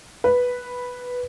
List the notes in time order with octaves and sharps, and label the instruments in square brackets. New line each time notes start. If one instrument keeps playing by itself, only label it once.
[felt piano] B4